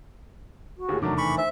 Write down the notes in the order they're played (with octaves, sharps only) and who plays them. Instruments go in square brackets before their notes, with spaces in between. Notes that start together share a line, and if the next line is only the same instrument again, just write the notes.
[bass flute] F#4
[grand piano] D#2 A2 [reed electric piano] G4 G#4
[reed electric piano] E2 C3 D6 [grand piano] D#3 A3 D4 [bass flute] F#3
[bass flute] E3 [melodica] B5 C#6
[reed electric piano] C5 [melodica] E5